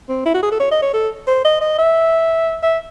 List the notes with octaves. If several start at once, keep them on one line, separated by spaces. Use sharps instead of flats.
C4
E4
F#4
G#4
A4
C#5
D#5
C#5
A4
C5
D#5
D#5
E5
E5